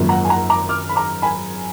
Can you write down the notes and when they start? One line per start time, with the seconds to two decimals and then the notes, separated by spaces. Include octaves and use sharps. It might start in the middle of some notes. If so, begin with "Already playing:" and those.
Already playing: G#1 F#2 F3 A#3
0.09 F#5 A#5
0.25 G#5
0.29 F#5 A#5
0.50 A#5 D6
0.69 D6 F6
0.89 B5
0.96 A#5 D6
1.22 G#5 B5